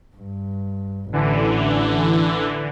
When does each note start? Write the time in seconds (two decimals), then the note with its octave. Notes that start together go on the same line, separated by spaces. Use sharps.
0.17 G2
1.13 A1 D3 E3